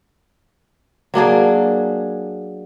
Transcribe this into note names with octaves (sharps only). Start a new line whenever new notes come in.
F#3 A#3 D4 G#4